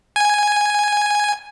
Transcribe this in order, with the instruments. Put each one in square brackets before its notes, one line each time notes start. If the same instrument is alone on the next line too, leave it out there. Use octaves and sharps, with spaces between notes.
[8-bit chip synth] G#5